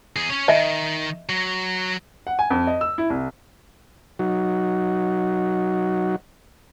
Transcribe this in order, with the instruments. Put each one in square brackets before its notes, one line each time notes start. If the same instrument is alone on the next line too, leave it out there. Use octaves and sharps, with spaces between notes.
[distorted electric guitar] E2 G#4
C#4 C#5
[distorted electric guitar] D#3 [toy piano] D#5 E5
[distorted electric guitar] F#3
[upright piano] F#5
G#5
F2
D#5
E6
E4
C2
[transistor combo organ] F#3 D#4 F#4